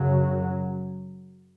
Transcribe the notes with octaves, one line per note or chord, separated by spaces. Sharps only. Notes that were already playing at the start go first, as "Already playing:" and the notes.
Already playing: F#2 C#3 F#3